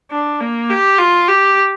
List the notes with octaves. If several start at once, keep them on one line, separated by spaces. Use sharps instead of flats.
D4
A#3
G4
F4
G4